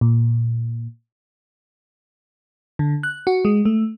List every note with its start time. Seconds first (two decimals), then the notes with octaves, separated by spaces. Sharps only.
0.01 A#2
2.79 D3
3.03 F#6
3.27 F#4
3.45 G#3
3.65 A3